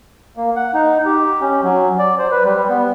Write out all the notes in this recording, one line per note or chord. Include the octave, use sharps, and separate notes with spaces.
A#3
F#5
D#4
G4
C#4
F#3
D5
C5
B4
G3
B3